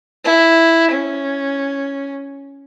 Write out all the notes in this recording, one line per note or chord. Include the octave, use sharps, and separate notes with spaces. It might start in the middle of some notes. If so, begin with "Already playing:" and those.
E4
C#4